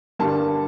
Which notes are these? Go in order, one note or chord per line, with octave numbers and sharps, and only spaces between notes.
G2 D3 G3 A#3 A5